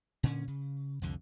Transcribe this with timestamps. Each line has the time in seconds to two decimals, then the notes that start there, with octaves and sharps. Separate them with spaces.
0.23 A#2 D3 C#4
0.48 C#3
1.02 C2 F2 D3